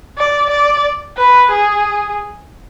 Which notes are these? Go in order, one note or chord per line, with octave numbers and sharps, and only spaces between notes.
D5
D5
B4
G#4